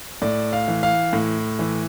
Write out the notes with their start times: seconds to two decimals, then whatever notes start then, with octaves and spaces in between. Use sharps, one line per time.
0.22 A2 D5
0.53 F5
0.68 E3
0.83 F5
1.13 A2
1.59 E3